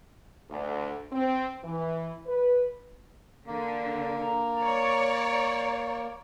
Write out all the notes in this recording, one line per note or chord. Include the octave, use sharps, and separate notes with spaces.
D2
C4
E3
B4
D3 A#3
A#5
C#5 D5